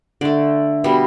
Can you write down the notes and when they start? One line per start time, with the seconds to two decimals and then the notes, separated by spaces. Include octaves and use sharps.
0.21 D3 A3 D5
0.84 B2 G3 B3